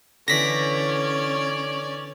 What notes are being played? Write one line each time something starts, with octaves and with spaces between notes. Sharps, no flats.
D3 E3 C#4 C#5 D5 A#6 B6